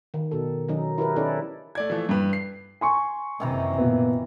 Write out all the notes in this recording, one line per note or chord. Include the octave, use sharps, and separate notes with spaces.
D#3
B2 A4
D#3 F#3 C#4 D#4
E4 G4 A#4 B4
C#4 D#4 E4 A4 D5
A3 D5 G#6
E3 F3 A3
G2 B4
C7
G#5 C6 C#6
F#1 C3 D#3 E3 A#5
A#2 B3